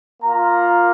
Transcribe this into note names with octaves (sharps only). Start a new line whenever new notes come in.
A#3 F4 A#5